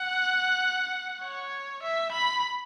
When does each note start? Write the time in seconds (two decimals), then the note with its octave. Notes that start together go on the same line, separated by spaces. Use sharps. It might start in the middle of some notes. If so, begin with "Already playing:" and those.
Already playing: F#5
1.24 C#5
1.82 E5
2.12 B5